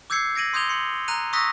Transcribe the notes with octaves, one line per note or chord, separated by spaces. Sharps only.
D6 E6 G6 G#6 C7 C#7
G#6 A#6 D7 D#7 F#7
C6 D#6 G6 G#6 F7 G7
C6 C#7
A#5 F#6 D#7 F7
C#6 D#6 E6 F#6 A#6 B6